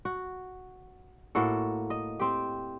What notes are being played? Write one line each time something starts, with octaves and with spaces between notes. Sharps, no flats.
F#4
A2 A#3 F#4 A4
D#5
C4 G4